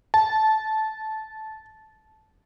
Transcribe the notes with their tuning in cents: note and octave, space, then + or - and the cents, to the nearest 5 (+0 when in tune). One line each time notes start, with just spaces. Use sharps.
A5 -15